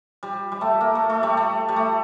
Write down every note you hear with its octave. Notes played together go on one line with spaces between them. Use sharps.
G3
G3
A3
A#3
A3
A3
G3
A3
G3
A3